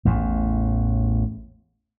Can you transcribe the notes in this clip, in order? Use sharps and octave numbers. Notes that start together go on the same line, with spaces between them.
A1 E2 A2